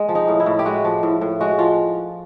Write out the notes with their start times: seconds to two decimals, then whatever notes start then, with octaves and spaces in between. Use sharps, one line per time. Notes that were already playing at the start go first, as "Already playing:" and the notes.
Already playing: G#3
0.09 F3
0.15 D#4
0.28 A2
0.40 E4
0.46 A2
0.59 G4
0.65 G#3 F#4
0.84 F3
1.03 A2
1.21 A2
1.41 G#3 F#4
1.59 F3 F4